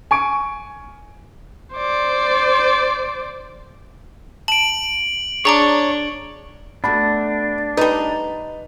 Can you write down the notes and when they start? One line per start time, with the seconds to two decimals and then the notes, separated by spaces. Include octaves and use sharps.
0.11 G#5 C#6 D7
1.74 C5 D5
4.48 A5 D7 F#7
5.45 D4 G#4 C#5 A#5 D6
6.84 A3 B3 D4 F#4 B5
7.77 G3 D#4 B4